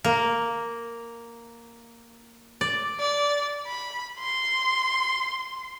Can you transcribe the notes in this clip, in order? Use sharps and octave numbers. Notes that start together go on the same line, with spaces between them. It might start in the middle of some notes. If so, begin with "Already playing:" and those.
A#3
D5
D5
B5
C6